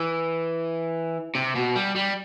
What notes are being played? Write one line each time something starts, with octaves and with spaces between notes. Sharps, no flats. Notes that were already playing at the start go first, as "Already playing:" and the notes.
Already playing: E3
C3
B2
G3
G3